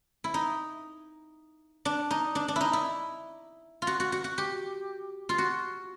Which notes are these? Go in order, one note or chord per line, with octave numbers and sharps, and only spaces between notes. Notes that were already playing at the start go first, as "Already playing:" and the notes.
E4
D#4
D4
D#4
D4
D4
D#4 E4
E4
F4
F#4
F#4
F#4
F#4
G4
F4
F#4